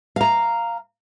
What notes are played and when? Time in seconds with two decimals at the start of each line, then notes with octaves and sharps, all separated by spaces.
0.16 F5 A#5